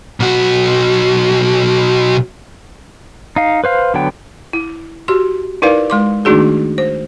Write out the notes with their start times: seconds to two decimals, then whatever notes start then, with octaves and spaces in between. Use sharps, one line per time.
0.20 B1 F#4
3.36 D#4 F5
3.64 B4 C5 F5
3.94 D3 F#3 B3 G5
4.53 E4
5.08 F#4 G4 C6
5.62 D#4 E4 A#4 B4 D5 F5
5.90 G#3 C6 D6
6.25 D#3 A3 D4 D#4 F#4 G#4
6.78 C5